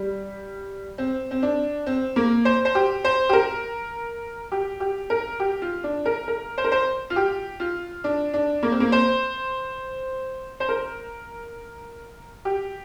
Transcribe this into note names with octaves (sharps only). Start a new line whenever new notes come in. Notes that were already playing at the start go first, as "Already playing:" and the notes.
Already playing: G3
C4
C4
D4
C4
A#3
C5
C5
G4
C5
G4
A#4
G4
G4
A#4
G4
F4
D4
A#4
A#4
C5
A#4
C5
F4
G4
F4
D4
D4
A#3
C4
A#3
C5
C5
A#4
G4